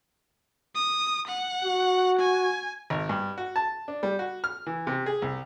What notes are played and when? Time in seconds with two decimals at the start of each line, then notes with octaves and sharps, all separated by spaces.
0.75 D#6
1.28 F#5
1.64 F#4
2.20 G#5
2.90 G#1
3.09 G2
3.38 F#4
3.56 A5
3.88 D4
4.03 G3
4.19 F#4
4.44 F6
4.66 E3
4.87 C3
5.06 G#4
5.22 C2